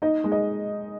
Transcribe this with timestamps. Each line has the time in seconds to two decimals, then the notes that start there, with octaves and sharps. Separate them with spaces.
0.02 D#4 D#5
0.24 G#3
0.32 D#5